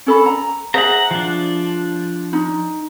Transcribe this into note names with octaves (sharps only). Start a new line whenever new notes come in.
C#4 A4 B5
A#5
G#4 C5 E5 F#5 A#5
F3 D4
D#4